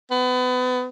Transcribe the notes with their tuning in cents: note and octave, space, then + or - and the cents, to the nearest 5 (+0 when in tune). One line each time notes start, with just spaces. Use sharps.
B3 +30